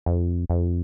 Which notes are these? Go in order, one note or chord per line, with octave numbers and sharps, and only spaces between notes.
F2
F2